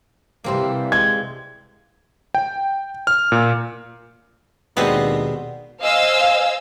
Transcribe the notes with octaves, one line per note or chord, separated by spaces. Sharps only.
C3 E3 G3 A#3 C4 C5
G#3 G#6
G5
F6
A#2
D#2 B2 G#3 B3 C4 D4 D#5
C5 D#5 F5 G#5 E6